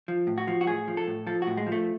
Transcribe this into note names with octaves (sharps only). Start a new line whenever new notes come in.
F3
A2
F#4
F3
F#4
A2 G#4
F3
A4
A2
F3 A4
A2 F#4
G#3
F3
A3